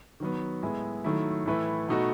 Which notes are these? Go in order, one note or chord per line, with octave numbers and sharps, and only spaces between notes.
D#3 F#3 B3
A2 G#3 B3 E4
D#3 F#3 A3 E4
A2 E3 A3 E4 B4
B2 A3 D#4 F#4